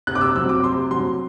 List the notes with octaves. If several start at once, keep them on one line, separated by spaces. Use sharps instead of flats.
C3 F#6
D6
E6
F#3 C4 E6
D6
C3 C6
F#3 C4 C6